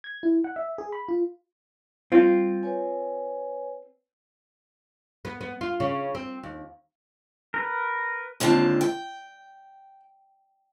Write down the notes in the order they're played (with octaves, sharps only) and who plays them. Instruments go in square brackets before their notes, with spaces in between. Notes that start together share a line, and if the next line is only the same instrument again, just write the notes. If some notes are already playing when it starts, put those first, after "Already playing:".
[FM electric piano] G#6
E4
F#5
E5
G#4
B5
F4
[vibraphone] G3 [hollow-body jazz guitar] C4 F4
[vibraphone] B4 C#5 G#5
[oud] B3
B3
F4
C#3
C4
D#2
[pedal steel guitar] A#4 B4
[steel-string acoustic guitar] D#2 G#2 D3 C4 F4 A5
G5